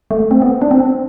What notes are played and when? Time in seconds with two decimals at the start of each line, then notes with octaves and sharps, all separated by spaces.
0.11 A3
0.31 C4
0.42 B3
0.62 D4
0.71 C4